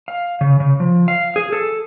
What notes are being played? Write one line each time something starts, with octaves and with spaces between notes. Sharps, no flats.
F5
C#3
C#3
F3
F5
G#4
A4